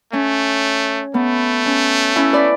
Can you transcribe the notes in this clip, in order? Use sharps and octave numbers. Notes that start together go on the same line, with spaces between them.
A3 C#4
A3 B3
C#4
C#4 E4
B4 D5